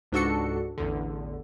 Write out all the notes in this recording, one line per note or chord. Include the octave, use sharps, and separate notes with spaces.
C#2 G#2 D4 F#4 A4 C#7
A1 E2 D3